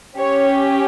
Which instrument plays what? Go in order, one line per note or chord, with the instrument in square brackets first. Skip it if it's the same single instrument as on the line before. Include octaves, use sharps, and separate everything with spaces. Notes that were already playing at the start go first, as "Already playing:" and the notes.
[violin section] C#4 G4 C#5